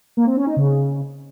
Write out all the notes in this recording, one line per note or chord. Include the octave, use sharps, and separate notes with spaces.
A#3
C4
C#4
D#4
C#3